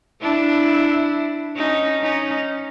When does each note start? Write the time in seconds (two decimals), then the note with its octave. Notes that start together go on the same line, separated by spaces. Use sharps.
0.21 D4 E4
1.57 C#4 D#4
2.02 C#4 D#4